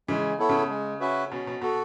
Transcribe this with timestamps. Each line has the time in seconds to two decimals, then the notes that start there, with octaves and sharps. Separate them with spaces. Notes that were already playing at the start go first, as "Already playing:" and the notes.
0.08 C#3 E3 G#3
0.39 B3 E4 A4 C#5
0.49 C#3
0.69 G#3
1.00 C#4 F#4 B4 E5
1.31 B2 C#4
1.47 B2
1.61 B2 F#4 A4